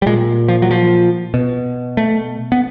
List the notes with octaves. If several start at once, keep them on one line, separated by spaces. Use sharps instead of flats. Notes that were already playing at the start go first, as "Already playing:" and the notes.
G3
A#2 G#3
F3
F#3
F3
B2
A3
B3